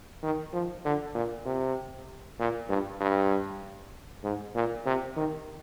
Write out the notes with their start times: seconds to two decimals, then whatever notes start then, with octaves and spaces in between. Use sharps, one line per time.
0.23 D#3
0.53 F3
0.85 D3
1.15 A#2
1.46 C3
2.39 A#2
2.69 G2
3.01 G2
4.24 G#2
4.55 A#2
4.86 C3
5.16 D#3